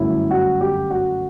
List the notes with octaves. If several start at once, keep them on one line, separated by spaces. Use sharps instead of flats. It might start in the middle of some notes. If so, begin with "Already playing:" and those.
Already playing: G1 F#2 F#3 A3 E4
F#4
G4
F#4